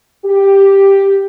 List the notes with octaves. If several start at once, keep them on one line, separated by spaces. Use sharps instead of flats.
G4